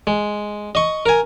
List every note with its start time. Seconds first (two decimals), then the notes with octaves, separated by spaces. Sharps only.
0.07 G#3
0.75 D#5 C#6
1.06 A#4 G#5